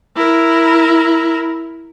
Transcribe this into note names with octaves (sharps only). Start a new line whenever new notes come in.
E4 A#4